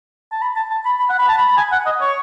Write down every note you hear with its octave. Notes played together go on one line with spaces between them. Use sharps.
A5
B5
A5
A5
B5
B5
F#5
B5
A5
B5
B5
G#5
F#5
D#5
C#5